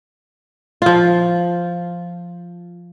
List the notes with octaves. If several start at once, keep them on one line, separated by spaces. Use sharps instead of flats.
F3 F4